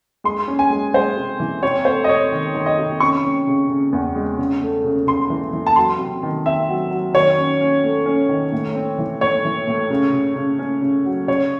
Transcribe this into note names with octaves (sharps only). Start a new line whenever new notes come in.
G#3 C6
C#4
G#5
G#3
G#3 C5
C3
E3
C3 C#5
A3 C5
D#5
C3 C#5
D#3
D#3
D#5
C3
C#4 C#6
C#4
C#3
C#3
E2
G#3
C#3
A3
C#3
C#3 C6
E3
E3
A5
F#3 C6
C3
D#3
C4 E5
F#3
F#3
D#3 C#5
C#4
C#4
A3
C#4
D#3
A2
C4
E3
A2 C#5
E3
A2
C#3
C#3
C#3
C#4
C#3
F#3
C#3 C#5